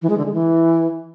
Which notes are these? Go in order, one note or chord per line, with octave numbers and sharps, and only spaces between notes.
E3
G#3
D3
G#3
E3